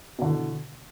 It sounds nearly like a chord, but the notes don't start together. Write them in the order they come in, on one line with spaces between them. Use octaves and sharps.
B2 D3 E3